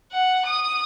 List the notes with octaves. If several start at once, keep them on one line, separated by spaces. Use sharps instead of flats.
F#5
D#6